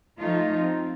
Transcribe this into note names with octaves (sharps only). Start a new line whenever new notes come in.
F3 A3 D#4 F4
C4